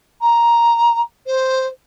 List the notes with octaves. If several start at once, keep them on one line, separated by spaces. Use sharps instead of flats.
A#5
C5